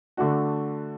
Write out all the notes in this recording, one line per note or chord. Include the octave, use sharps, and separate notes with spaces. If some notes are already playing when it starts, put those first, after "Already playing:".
D3 A3 D4 F#4